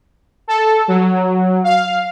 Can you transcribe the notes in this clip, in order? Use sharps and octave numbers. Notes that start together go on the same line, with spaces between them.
A4
F#3
F5